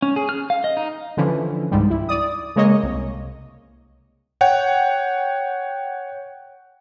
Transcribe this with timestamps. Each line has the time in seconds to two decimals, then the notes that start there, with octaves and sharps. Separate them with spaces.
0.02 C#4
0.16 G#4
0.29 F6
0.50 F5
0.64 D#5
0.77 D#4
1.17 D3 E3 F3 C#4
1.71 C#2 G#2 G3
1.90 E4
2.09 D5 D#6
2.56 C#3 G#3 A#3 C#5 D#5
2.83 C2
4.41 C#5 F#5 G5